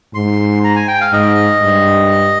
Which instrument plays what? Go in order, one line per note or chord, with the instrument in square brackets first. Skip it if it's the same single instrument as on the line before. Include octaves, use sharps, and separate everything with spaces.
[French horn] G#2 [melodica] C6
[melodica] A#5
G#5
G5
F5
[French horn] G#2 [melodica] D#5
[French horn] G2